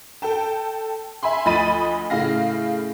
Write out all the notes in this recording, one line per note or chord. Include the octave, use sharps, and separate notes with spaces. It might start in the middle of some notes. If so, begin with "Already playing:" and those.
A4 G5 A5
E5 G#5 B5 C6
D2 F3 D#5 B5 A6 D#7
A2 C#3 F5 A#6